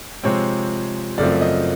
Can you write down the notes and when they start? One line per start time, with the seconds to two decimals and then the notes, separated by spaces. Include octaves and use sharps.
0.24 C3 F3 G#3 C4 C#5
1.18 F#2 C#3 F3 A3 C4 D5
1.41 D#5